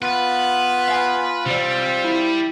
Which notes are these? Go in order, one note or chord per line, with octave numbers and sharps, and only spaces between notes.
B3 F4 B4
F5 G#5
C3 G3 C4 D5
E4